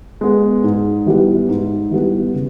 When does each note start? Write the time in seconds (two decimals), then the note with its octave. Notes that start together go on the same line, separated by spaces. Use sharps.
0.21 G#3 B3
0.64 G#2
1.06 E3 G3 B3
1.49 G#2
1.91 E3 G3 B3
2.34 C#3